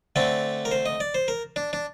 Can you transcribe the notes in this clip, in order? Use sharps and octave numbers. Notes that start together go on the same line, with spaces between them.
D3 A3 C4 D5
A#4
C5
D#5
D5
C5
A#4
D4
D4